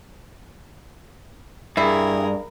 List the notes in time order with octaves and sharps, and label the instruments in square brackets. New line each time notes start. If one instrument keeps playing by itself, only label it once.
[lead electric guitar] G2 [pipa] E4 [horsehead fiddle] G#4 [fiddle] A#4